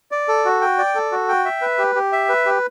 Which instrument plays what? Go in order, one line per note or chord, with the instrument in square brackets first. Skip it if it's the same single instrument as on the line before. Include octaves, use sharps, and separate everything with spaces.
[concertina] D5
A4
F#4
G5
D5
A4
F#4
G5
E5
B4
G4
G4
E5
B4
G4